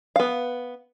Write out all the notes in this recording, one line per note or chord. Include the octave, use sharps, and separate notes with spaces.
B3 F5